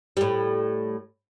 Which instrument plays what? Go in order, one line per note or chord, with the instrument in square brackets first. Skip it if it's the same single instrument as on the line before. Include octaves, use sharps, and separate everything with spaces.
[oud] A2 G3